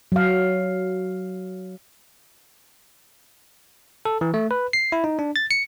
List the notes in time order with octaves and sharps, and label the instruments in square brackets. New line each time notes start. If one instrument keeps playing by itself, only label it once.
[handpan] F#3 F5
[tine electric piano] A4
E3
A3
B4
C7
E4
D#4
D4
A6
C#7